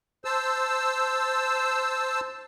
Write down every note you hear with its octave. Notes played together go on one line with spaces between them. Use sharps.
C5 A5 E6